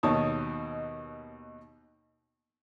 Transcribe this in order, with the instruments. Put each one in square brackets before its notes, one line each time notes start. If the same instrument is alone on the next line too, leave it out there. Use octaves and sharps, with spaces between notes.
[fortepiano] D#2 B2 D#4 C#5 A5 D#6